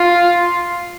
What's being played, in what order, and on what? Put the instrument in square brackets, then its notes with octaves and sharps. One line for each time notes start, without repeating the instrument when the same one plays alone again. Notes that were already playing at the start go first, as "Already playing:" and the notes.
Already playing: [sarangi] F4